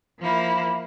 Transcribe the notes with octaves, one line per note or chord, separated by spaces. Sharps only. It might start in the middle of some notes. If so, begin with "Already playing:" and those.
F3 A#3 E4